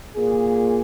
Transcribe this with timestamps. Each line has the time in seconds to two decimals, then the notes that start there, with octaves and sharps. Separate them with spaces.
0.15 A#2 G#4